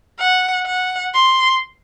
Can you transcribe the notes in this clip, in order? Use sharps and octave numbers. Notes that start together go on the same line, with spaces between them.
F#5
F#5
C6